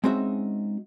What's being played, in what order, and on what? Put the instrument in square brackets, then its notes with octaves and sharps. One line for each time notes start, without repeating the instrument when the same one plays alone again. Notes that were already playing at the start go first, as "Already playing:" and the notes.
[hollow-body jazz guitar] G#3 C4 C#4 D#4 F#4 E5